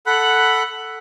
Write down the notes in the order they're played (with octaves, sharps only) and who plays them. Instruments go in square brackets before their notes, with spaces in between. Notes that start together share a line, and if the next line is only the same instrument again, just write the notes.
[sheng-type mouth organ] A4 F#5 B5 F#6